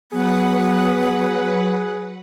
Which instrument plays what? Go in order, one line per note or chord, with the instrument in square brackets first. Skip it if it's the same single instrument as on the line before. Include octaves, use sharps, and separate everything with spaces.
[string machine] F#3 B4 F#5 [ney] B3 [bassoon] G#4